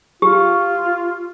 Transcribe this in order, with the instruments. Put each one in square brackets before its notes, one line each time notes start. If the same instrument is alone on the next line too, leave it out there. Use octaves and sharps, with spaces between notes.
[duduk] F4 [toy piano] G4